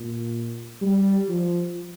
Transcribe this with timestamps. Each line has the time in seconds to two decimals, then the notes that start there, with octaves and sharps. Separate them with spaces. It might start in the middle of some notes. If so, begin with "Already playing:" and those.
Already playing: A#2
0.81 G3
1.29 F3